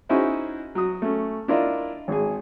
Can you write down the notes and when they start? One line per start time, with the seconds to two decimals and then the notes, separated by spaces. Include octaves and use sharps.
0.09 C#4 D#4 E4 F#4 G#4 C5
0.75 F#3 D#6
1.02 A3 C#4
1.48 D4 E4 F4 A#4 D#5
2.08 G#1 G#4